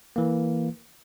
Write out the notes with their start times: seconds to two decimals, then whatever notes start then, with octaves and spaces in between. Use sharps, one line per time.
0.16 E3 A#3